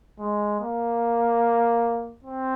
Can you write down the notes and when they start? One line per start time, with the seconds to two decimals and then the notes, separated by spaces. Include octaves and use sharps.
0.19 G#3
0.61 A#3
2.24 C4